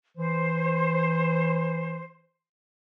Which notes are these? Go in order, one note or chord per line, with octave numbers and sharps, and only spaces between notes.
E3 C5